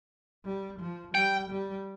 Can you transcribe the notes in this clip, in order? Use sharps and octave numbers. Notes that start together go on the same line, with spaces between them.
G3
F3
G3 G5
G3